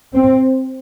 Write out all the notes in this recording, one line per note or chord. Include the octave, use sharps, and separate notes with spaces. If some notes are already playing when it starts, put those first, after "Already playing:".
C4